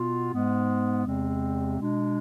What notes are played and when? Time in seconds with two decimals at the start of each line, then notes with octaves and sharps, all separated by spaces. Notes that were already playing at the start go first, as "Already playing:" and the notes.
Already playing: B2 B3 F4
0.33 G#2 G#3 B3
1.06 E2 C3 G#3 C4
1.79 B2 G#3 D4